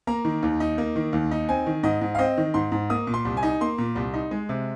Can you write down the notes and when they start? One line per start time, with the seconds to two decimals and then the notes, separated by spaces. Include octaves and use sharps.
0.07 A#3 A#5
0.25 D#3
0.43 D#2
0.60 D#4
0.78 A#3
0.96 D#3
1.13 D#2
1.31 D#4
1.49 C4 G#5
1.66 D#3
1.83 G#2 D#5
2.01 G#2
2.15 F5
2.19 C4 D#5
2.37 D#3
2.54 G#2 C6
2.72 G#2
2.90 A#3 D#6
3.07 A#2
3.14 C6
3.25 C2
3.37 G#5
3.43 D#4
3.61 A#3 C6
3.78 A#2
3.96 C2
4.14 D#4
4.31 G#3
4.49 C3